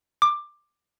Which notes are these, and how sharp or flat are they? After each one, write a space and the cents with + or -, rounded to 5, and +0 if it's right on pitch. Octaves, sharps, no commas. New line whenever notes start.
D6 +15